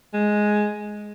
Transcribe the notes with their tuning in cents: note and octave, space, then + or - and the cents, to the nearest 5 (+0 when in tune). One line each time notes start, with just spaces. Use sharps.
G#3 +5